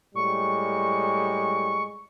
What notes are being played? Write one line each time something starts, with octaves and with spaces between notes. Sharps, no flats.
A2 G3 G#3 C#6